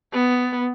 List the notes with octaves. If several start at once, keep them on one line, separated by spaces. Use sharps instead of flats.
B3